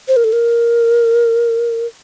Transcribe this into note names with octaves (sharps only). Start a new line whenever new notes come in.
C5
A#4
A4
A#4